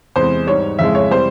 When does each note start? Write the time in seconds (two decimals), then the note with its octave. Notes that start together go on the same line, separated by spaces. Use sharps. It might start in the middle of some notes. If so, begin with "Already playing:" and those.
0.16 E2 C3 E3 G#3 C5
0.47 G#2 G3 C#5
0.79 F2 C#3 E3 G#3 E5
0.95 C#5
1.11 C3 E3 G3 C5